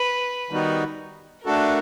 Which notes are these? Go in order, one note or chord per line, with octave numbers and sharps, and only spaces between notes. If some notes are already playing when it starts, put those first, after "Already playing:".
Already playing: B4
D#3 G3 B3 D#4 F#4
A3 D4 F#4 A4 A#4